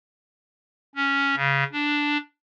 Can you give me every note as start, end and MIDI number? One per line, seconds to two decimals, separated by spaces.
0.95 1.35 61
1.36 1.64 49
1.73 2.18 62